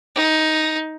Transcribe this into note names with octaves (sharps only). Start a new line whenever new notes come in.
D#4